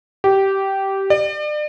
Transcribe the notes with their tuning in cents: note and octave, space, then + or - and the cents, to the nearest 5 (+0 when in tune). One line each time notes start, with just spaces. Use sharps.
G4 -15
D5 +35